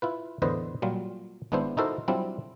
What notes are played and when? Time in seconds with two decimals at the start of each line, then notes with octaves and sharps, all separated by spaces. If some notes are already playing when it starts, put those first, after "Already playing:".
0.02 E4 F4 B4
0.42 E2 A2 D3 B4 C5 D#5
0.82 A#2 F#3 G3 F4
1.52 G#1 G#2 B3 D4 E4 C5
1.77 D#4 E4 F#4 A4 A#4 C5
2.08 F#3 G3 C4 D4 E4 F4